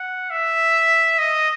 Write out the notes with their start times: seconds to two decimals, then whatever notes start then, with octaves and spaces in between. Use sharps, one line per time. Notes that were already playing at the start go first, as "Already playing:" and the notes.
Already playing: F#5
0.30 E5
1.19 D#5